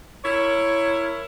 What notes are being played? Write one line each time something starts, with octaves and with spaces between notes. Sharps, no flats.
E4 A#4 C#5